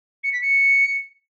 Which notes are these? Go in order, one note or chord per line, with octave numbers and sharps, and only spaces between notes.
C#7
B6
C#7